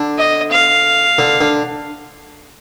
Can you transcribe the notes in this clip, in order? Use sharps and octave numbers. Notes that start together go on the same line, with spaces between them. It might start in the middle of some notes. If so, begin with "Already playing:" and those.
Already playing: D3
D#5
F5
D3
D3